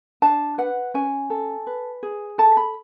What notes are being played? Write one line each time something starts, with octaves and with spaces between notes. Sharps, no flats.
D4 A5
B4 F#5
C#4 G#5
A4
B4
G#4
A4 A5
B5